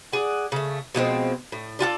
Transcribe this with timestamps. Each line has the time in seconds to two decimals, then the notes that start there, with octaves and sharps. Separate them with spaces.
0.12 G#4 D5 F#5
0.52 C#3 A3
0.95 B2 F3 G#3 C4
1.52 A2
1.79 D4 F4 F#4 A4